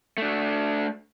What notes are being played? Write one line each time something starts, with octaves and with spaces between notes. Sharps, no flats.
A3 D4